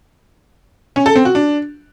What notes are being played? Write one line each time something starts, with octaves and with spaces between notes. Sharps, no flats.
C#4
A4
C4
F#4
D4